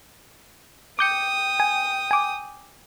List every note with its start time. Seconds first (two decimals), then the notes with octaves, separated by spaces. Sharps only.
0.99 G5 D6 D#6 G6 C#7
1.60 G#5
2.11 G#5 D6